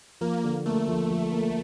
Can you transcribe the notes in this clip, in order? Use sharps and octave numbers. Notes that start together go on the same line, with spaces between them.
F3 A#3
D3
A3 A#3
F3
F3
A#3